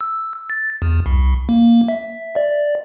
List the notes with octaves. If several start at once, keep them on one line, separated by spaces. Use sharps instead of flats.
E6
A6
E2
C2
A#3
E5
D5